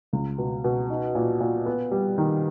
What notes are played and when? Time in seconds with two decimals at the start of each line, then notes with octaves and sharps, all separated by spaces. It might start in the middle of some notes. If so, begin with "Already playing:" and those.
0.13 C#2
0.38 B2
0.64 B2
0.90 D#4
1.15 A#2
1.40 A#2
1.66 B3
1.92 G3
2.18 D#3